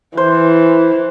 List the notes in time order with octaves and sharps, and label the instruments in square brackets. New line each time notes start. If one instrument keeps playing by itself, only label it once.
[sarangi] E3 [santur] C5